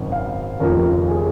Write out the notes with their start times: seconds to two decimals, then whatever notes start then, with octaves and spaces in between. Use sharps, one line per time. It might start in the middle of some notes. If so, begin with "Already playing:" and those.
Already playing: G#1 F#2 C#3
0.12 F5
0.60 F1 D#2 C#3 F3 A#4
1.08 G#4